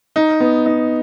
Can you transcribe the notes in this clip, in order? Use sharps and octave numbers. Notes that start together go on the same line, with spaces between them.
D#4
B3
D#4